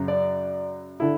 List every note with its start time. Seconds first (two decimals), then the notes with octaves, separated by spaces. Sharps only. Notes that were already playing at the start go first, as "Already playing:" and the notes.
Already playing: F#2 C#3 F#3
0.08 D5
1.00 D3 E4